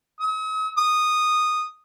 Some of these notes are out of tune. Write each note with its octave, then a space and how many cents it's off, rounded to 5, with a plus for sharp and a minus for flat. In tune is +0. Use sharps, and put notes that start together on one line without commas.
D#6 +45
D#6 -10